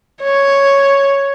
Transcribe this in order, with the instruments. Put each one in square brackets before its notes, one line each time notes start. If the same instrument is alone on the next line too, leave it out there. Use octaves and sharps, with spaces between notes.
[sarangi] C#5